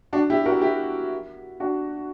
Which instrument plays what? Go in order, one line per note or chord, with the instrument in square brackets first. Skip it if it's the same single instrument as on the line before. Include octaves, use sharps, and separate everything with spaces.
[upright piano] D4 F#4
E4 G4
F#4 A#4
E4 G4
D4 F#4